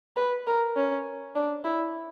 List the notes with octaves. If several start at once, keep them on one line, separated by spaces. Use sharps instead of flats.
B4
A#4
C#4
D4
E4